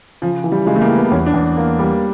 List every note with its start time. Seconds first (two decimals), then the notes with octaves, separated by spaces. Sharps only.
0.22 C#3 F3
0.44 E3
0.52 G3
0.66 C#3 G#3
0.76 A3
0.81 A#3
0.89 G3
0.96 B3
1.11 E2 C#4
1.26 D4
1.34 E2
1.57 A#3
1.79 G3